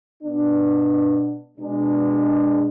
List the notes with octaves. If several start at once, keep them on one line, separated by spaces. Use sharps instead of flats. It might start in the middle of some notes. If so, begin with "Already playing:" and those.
B2 B3 D4
B2 G#3 D4